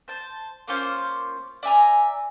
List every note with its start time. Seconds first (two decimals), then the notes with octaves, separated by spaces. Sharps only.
0.08 C5 A5
0.68 A#3 C#4 F4 C5
1.63 D5 E5 G#5 A#5